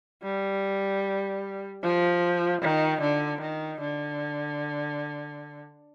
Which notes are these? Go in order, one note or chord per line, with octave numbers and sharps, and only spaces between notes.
G3
F3
D#3
D3
D#3
D3